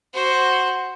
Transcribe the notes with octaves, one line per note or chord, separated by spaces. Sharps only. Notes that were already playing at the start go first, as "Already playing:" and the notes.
F#4 C5